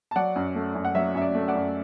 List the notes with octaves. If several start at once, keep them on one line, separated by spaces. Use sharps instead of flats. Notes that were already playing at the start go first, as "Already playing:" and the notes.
A5
F#3 D5 F#5
F#2
A3
F#2
F#5
F#3 E5
F#2 E5
D5
A3
D5 F#5
F#2